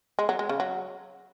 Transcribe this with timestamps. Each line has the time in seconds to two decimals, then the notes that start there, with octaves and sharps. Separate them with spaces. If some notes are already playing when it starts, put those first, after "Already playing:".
0.19 G#3
0.29 F#3
0.39 G#3
0.49 C#3
0.60 F#3